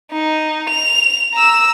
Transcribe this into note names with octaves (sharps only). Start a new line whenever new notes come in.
D#4
F7
A#5 E6